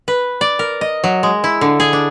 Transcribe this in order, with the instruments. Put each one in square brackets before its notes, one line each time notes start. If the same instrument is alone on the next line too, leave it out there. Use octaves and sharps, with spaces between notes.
[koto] B4
D5
A#4
D#5
F#3
G#3
E4
D3
G#4
D4